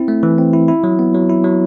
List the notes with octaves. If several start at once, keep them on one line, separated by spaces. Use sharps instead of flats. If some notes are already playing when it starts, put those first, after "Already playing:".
Already playing: C4 E4
A3
E3
C4
E4
E4
F#3
B3
F#3
E4
F#3